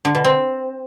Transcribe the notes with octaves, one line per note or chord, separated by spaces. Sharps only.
D3
B2
C4